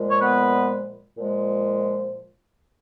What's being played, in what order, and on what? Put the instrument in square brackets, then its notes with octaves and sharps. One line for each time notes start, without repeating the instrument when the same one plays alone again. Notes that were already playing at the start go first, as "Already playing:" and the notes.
Already playing: [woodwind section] A#2 F3 G#3
C#5
B3 B4
A#2 F3 G#3